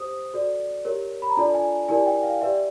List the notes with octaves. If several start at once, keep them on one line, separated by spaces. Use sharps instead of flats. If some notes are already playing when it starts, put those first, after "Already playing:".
Already playing: G4 C5 D#6
F#4 A4 D5
G4 A#4 C#5
B5
A#5
D4 F4 A4 D5 A5
G#5
E4 G4 A#4 D5 G#5
G5
F5
G4 B4 D5 E5